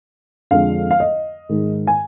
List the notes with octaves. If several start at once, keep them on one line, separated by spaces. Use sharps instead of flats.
F2 D3 F3 G#3 F5
F5
D#5
G#2 D#3 G#3
G#5